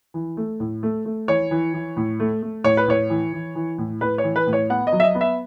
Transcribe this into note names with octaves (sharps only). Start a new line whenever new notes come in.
E3
A3
A2
A3
A3
E3 C#5
E3
E3
A2
A3
A3
A2 C#5
B4
A2 C#5
E3
E3
E3
A2
A2 B4
C#5
E3
B4
A2
C#5
B3 F#5
D#5
F#3
E5
D#5
B3
E5